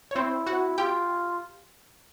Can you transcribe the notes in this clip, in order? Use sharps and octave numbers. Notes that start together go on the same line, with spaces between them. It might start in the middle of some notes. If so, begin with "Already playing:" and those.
C#5
C4 E4 C5
F#4 F#5
F4 G4 G5